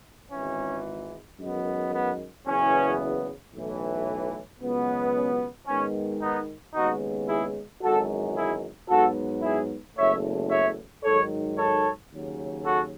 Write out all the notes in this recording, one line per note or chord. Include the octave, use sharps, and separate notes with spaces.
G#1 G#2 E3 C#4
F#2 D#3 G#3 B3
B3
F#1 E2 C#3 E3 B3 C#4
B1 A2 E3
C#2 B2 F#3 B3
C#4
G#2 D#3 G#3 B3 C#4
B3 D#4
D#2 C#3 G#3 B3 D#4 F#4
E4 G#4
G#1 F#2 E3 G#3 F#4 A4
E4 G#4
G#2 F#3 B3 F#4 A4
E4 G#4
F#1 E2 B2 A3 C#5 E5
C#5 E5
G#2 D#3 F#3 A4 C#5
A4 C#5
D#2 C#3 F#3
F#4 A4